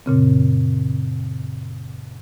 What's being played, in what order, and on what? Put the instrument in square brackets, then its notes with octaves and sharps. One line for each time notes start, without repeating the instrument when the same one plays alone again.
[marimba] F#2 A#2 C#3 C4